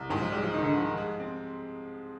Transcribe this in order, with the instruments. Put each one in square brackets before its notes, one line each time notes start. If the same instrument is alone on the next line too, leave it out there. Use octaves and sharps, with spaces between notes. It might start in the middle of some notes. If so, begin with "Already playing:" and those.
Already playing: [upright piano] C2
[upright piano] G#2 [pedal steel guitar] D#3
[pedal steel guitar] F3
[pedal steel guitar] G3 [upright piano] G#3
[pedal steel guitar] F3
[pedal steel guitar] D#3 [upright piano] D#4
[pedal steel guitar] D3
D#3
[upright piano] F3
G#3
C4